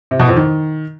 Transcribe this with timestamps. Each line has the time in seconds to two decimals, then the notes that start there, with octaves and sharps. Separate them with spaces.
0.11 C3
0.19 B2
0.28 F2
0.36 D#3